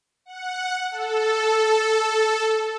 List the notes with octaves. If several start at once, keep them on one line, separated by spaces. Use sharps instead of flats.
F#5
A4